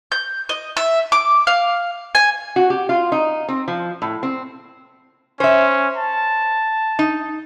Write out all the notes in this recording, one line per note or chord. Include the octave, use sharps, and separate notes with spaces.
G6
D#5
E5
D6
F5
G#5
F#4
G4
F4
D#4
C4
F3
A2
C4
C#4 C5 E5
A5
D#4